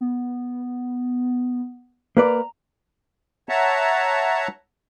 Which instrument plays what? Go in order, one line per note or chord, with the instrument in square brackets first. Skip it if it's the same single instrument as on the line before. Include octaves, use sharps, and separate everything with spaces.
[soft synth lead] B3
[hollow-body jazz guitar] A#3 B4 D5 [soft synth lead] A#5
[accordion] C#5 E5 F#5 A5 A#5